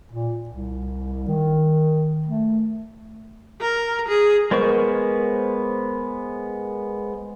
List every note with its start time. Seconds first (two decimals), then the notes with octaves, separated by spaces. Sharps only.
0.12 A#2
0.49 C2
1.28 D#3
2.26 A3
3.61 A#4
4.09 G#4
4.51 G#3 B3 A#4 C5 C#6